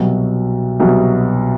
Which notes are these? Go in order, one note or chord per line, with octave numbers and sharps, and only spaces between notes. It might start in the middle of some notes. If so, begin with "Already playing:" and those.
Already playing: C2 B2 F#3
C2 B2 F#3